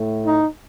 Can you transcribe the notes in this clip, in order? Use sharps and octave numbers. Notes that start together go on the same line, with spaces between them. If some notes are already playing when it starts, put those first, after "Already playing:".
Already playing: A2 A3
D#4